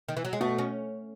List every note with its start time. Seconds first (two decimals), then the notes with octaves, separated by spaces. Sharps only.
0.09 D#3
0.17 E3
0.25 F#3
0.33 G#3
0.40 B2 A3
0.58 C#4